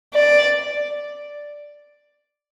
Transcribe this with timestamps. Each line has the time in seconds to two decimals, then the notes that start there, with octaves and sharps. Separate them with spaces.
0.15 D5